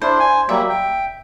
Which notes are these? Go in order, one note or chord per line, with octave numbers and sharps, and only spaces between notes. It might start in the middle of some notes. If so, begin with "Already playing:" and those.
D4 E4 C5
G#5
F#3 G3 A#3 E5
G5